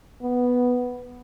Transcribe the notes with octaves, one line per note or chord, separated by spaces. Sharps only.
B3